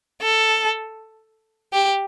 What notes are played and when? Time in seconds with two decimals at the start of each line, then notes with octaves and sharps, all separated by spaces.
0.22 A4
1.73 G4